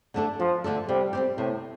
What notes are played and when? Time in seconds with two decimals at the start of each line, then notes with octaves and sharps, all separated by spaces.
0.14 D3 A3 D4 A4
0.40 F2 F3
0.64 D3 A3 D4 A4
0.89 C3 G3
1.13 G3 C4 G4
1.38 A2 C3